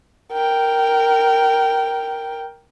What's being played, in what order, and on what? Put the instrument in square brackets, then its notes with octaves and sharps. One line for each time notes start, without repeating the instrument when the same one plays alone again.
[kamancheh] A#4 G5